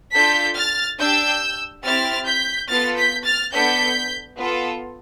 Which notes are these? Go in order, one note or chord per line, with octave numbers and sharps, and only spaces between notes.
D4 F4 A4 G6 B6
F6 A6
D4 G4 E6 G6
C4 E4 G4 F6 A6
G6 B6
B3 F4 A4 F6 A6
G6 B6
F6 A6
B3 D4 A4 G6 B6
B3 F4 A4